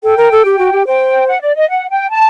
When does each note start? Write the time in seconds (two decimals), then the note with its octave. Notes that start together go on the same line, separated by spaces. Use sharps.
0.03 A4 G5
0.17 A#4
0.31 A4
0.45 G4
0.59 F#4
0.73 G4
0.86 C5 G5
1.27 F#5
1.41 D5
1.55 D#5
1.69 F#5
1.89 G5
2.11 A5